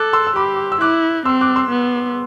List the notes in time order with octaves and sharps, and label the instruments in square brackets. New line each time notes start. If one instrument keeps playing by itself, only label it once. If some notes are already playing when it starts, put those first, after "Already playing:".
Already playing: [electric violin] A4 [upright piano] D6 F#6
[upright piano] C6 E6
E6
[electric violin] G4 [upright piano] B5 D6
[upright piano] E6
[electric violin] E4 [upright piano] D6 F#6
[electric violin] C4 [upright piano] C6 E6
[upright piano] D6 F#6
C6 E6
[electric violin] B3